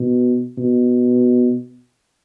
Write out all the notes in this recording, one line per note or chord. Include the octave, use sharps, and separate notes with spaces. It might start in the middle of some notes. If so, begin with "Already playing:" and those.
Already playing: B2
B2